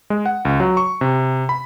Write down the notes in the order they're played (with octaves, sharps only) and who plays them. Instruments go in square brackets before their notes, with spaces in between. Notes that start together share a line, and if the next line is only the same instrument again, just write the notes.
[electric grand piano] G#3
F#5
C#2
F#3
C#6
C3
B5